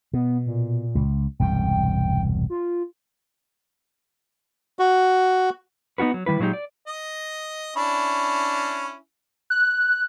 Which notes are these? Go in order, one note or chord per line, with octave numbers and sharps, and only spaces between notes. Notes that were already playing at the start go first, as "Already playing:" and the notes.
B2 B3
A#2
C#2
E1 C2 G2 G5
F4
F#4
B3 D#4 F4 F#4 B4
F#3
D#3 G3 E4 B4
A#2 F#3 G#3 D#4 G4
D5
D#5
C#4 D4 E4
F#6